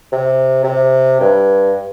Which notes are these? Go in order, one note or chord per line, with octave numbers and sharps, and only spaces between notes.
C3
C3
G2